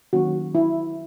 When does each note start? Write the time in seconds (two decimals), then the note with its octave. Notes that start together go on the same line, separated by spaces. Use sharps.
0.13 D#3 F#3 A#3 C#4 F#4
0.55 E4